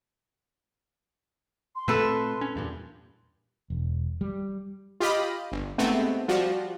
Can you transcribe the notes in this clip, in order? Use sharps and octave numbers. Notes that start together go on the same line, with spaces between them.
C6
A#2 A3 C4 A4 B4 E5
C#4
E2 G2 A#2
E1
G3
F4 G4 D#5 B5
G1
G#2 C3 A3 B3 C4
F3 G3 F#4